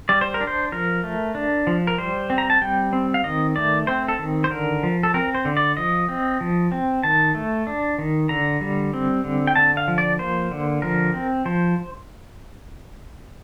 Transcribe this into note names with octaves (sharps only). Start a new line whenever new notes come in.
G3 D5
C5
A#4
D4
C5
F3 A#4
A3
D4
F3
A#4
G3 C5
C4
A#5
A5
G3 G5
C4
F5
D#3 D#5
A3 D5
C4 C5
A4
D#3
C5
D3 A#4
F3
A4
C4 A#4
C5
D3
D5
F3 D#5
C4
F3
C4
D#3 A5
A3
D4
D#3
D3 A#5
G3
C4
D3
G5
D3 A5
F5
F3
D5
A#3 C5
D3
F3 A#4
C4
F3 C5